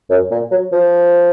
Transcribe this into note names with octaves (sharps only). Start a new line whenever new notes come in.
F#2
A#2
F#3
F3